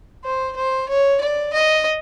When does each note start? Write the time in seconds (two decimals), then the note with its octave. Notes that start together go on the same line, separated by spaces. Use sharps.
0.24 C5
0.56 C5
0.89 C#5
1.21 D5
1.53 D#5